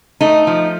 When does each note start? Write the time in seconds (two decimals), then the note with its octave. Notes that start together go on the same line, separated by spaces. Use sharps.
0.21 A3 D#4
0.47 F3